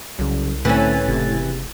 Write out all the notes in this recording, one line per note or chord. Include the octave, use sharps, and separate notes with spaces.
C2 C#3 F#3
A2 D3 E3 A3 C4 C#4 A6
F#1 C3